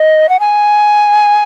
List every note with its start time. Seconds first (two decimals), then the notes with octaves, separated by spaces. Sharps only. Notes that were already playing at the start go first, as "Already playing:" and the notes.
Already playing: D#5
0.29 F#5
0.40 G#5